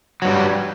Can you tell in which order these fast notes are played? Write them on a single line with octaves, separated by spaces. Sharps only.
F#3 G2 G3